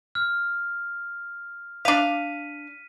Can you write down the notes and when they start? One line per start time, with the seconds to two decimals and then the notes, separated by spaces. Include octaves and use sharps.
0.15 F6
1.85 D4 F5 B6 D#7